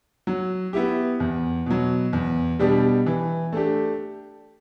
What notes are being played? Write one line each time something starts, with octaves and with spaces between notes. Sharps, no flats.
F#3
B3 E4 G4
E2
B2 F#3
E2
B2 G3 D4 G4
E3
A3 D4 G4